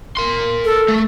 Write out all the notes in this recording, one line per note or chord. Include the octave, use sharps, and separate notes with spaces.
A#4 C6
A4
A3